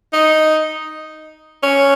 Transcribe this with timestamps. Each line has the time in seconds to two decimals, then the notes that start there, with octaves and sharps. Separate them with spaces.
0.13 D#4
1.63 C#4